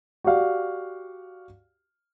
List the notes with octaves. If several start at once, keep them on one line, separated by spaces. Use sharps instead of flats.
F#4 G4 D5 F5